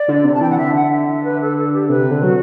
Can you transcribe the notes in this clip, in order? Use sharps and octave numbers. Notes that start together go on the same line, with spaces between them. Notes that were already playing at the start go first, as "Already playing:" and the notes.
Already playing: D5
D3
C3
A5
E3 G5
F#5
D3 E5
F#5
E5
E5
B4
A4
A4
G4
C3 B4
D3
F#3 F#4